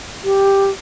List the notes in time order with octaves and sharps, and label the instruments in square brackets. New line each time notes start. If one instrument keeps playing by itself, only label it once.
[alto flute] G4